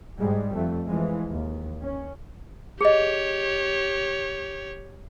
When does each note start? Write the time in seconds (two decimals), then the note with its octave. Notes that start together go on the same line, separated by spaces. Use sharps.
0.18 G#2 G3 G#3
0.52 F2 A3
0.86 E3 F3 G#3
1.29 D#2
1.82 C#4
2.81 G4 G#4 C#5 D#5